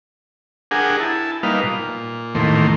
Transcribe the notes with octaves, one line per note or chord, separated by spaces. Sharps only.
D4 G4 G#4 A#4 F#5 G#5
E4 A5
G3 A#3 D#4 B4 F5
A#2
E2 A2 D#3 A3 A#3 C6